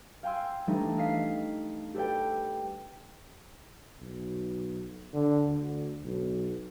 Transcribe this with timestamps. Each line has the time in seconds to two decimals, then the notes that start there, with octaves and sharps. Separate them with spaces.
0.23 F5 G5 G#5 C6 E6
0.67 E3 G3 A3 D4 D#4
0.98 D#5 F5 B6 C7
1.94 G4 A4 B4 D5 G5
4.00 B1
5.14 D3
5.46 D2
6.03 B1